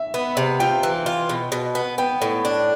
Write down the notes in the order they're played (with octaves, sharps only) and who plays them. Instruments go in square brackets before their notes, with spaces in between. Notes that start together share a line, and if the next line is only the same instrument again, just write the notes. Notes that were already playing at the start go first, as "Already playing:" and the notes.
Already playing: [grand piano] E5
[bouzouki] B3
C3
[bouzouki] F4 [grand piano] G5
[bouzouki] E3
F4
B2
B2
B3
[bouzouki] B3 [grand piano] G5
[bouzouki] A2
D4